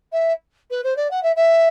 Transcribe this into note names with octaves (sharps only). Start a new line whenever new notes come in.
E5
B4
C5
D5
F#5
E5
E5